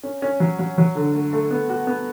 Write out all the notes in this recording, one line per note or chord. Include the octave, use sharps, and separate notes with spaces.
C#4
C#4
F#3
F#3
F#3
D3
A3
A3
B3
F#4
B3